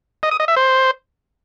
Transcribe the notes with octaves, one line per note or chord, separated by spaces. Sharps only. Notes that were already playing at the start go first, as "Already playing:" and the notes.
D#5
D#6
D#5
E5
C5